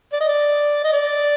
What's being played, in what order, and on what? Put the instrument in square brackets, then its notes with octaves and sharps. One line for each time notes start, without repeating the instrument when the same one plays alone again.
[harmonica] D5
D#5
D5
D#5
D5